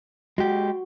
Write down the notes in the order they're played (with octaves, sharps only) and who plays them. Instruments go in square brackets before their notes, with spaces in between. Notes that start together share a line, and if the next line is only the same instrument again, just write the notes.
[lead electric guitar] G#3 G4 [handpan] F#4